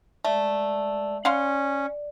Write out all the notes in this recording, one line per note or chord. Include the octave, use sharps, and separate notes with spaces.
G#3 A3 D5
C#4 D5 F5 F#5 C6